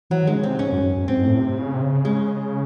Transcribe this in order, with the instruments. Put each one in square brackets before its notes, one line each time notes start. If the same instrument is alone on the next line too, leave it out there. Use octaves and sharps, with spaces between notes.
[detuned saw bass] E3 [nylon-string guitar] F#3
[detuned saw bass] D#3 [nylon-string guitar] G#3
[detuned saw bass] C#3
[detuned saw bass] C3 [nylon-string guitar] C4
[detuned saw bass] G#2 [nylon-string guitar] C#4
[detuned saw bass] F#2
F#2
F#2
[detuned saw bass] G#2 [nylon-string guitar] C4
[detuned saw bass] A2
C3
C#3
C3
C#3
[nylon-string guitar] G#3